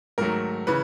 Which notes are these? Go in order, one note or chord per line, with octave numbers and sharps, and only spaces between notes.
G#2 D#3 F#3 A3 A#4
C#3 E3 B4